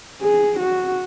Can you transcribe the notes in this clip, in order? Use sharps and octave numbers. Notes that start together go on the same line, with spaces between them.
G#4
F#4